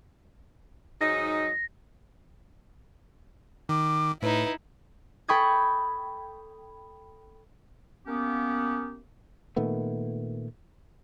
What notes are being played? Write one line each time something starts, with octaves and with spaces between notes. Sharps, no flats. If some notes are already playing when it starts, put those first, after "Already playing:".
G#2 F#3 D#4 A#6
D#3 D6
A2 D#4 E4 B4
A4 G5 B5 C#6 D#6 G#6
A#3 B3 C#4 G4
A#2 D#3 A3 B3